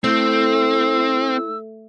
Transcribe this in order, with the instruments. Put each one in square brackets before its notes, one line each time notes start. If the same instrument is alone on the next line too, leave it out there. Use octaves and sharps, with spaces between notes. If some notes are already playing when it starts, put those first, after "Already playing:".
[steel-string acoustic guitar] A3 [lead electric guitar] C4 [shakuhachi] E4 [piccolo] E6